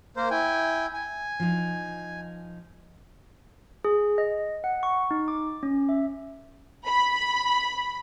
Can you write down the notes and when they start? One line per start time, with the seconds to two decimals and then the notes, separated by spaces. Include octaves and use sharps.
0.17 A#3 A#4 C5
0.31 E4 G5 G#5
0.94 G#5
1.40 F3 D#4
3.85 G#4
4.18 D#5
4.64 F#5
4.83 C#6
5.11 D#4
5.28 D6
5.63 C#4
5.89 E5
6.86 B5